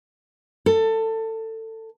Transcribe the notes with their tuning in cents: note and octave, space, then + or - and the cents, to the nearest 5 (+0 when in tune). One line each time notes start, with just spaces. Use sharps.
A4 +20